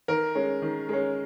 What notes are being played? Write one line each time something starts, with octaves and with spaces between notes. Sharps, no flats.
D#3 A#4
G#3 C#4
D#3
G#3 C#4